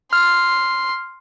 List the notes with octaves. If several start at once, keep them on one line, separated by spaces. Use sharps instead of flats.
C6 F6